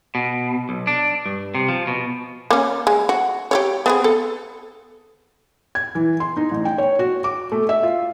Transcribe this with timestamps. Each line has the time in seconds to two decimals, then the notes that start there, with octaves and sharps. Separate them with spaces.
0.15 B2
0.69 B1
0.87 D4
1.26 G2
1.55 C3
1.69 F3
1.87 B2
2.51 A#3 C#4
2.87 G#3
3.09 F#4
3.51 G4 A4 C#5
3.86 B3 C4 G#4
4.04 A4
5.75 G#6
5.95 E3
6.20 C6
6.37 D#4
6.51 A1
6.65 G5
6.78 C#5
6.99 F#4
7.24 D6
7.52 A3
7.69 E5
7.83 F4